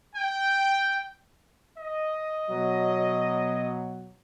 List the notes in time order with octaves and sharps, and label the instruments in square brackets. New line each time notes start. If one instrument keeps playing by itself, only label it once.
[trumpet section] G5
[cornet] D#5
[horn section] B2 F#3